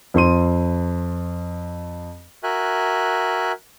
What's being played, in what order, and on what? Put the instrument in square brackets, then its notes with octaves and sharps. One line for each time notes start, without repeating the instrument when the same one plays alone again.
[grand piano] F2 C5 C6 D#7
[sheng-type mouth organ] F#4 A#4 E5 G#5 F#6